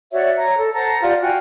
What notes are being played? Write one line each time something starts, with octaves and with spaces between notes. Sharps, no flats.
F#4 C#5 D5 E5
C#5 A#5
A4
C5 F#5 A5 A#5
F4 G4 D5 F#5
F#4 F5 G5 G#5